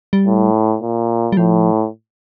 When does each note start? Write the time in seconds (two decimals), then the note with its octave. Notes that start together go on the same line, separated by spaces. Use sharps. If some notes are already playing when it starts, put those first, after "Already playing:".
0.13 G3
0.27 A2
0.82 A#2
1.32 G3
1.37 A2 F3